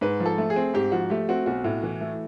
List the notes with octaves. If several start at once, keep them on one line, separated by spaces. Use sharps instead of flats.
G#2 B4
F3
A4
A3
G#4
C4
G#2 G4
F3 F#4
A3 G4
C4 F#4
B1 F#4
A2
E3
A3